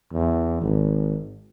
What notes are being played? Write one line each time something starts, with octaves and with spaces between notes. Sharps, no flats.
E2
G#1